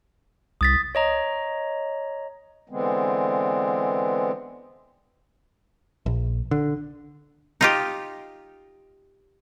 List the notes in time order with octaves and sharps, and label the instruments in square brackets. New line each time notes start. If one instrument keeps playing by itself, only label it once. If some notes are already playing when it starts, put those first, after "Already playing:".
[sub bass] C2 [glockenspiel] D#6 A6 B6
[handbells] C#5 D#5 A#5
[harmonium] D3 E3 G#3 B3 C4
[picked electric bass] A#1
D3
[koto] D#4 F4 G4